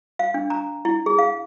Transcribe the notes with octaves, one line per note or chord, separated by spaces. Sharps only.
F5
D4
A#5
E4
G#4
F5